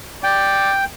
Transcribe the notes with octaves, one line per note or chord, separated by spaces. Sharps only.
D5 G5